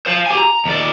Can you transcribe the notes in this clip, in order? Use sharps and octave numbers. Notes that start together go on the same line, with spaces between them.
C5 F5
G4 G#5
A#5
D#2 D5